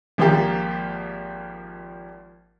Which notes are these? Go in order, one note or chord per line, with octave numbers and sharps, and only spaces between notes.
G#1 F3 A#3 G4